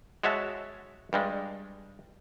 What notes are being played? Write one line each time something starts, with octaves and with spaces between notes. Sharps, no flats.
G#3 F#4 C#5 E5 A5
G2 G3 G#3